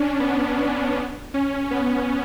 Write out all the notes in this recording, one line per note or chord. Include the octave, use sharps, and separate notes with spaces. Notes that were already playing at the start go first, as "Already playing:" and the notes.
Already playing: C#4 D4
B3
C#4
B3